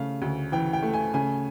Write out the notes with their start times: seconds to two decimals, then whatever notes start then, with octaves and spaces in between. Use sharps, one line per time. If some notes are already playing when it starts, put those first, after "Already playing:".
Already playing: C#3 A3 F5
0.22 D2
0.52 E3 G5
0.73 G5
0.82 A3
0.94 G#5
1.14 C#3 G#5